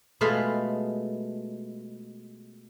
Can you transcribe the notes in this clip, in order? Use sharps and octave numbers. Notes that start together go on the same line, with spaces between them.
B2 G#3 A3 F4 B4 F5